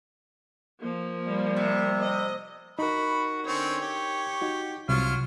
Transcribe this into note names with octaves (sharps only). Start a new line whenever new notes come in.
F3 A#3
G3
C3
D#5
D#4 F#4 A#4 B5
D3 C4 C#4 C#5
G4
D#4 F#4
C2 C3 F#3 F4 F6